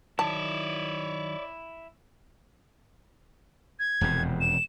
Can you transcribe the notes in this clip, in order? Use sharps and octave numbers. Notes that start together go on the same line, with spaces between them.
D#3 F#3 E4 C#5 D5 A5
G#6
E1 F2 C3
E7